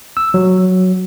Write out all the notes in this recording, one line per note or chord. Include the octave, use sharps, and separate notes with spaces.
E6
F#3